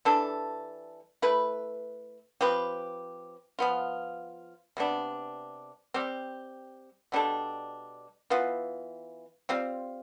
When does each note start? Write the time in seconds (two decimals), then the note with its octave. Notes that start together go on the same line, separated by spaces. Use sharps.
0.05 E3 G3 D4 A4
1.22 A3 E4 B4
2.41 F3 C4 G4 B4
3.59 F3 B3 F4
4.77 C3 G3 B3 D4
5.94 G3 C4 G4
7.12 B2 G3 D4 A4
8.30 E3 B3 F4
9.49 G3 C4 F4